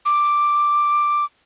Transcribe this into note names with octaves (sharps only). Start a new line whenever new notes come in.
D6